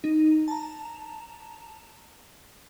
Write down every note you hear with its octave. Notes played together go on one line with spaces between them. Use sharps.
D#4
A5 A#5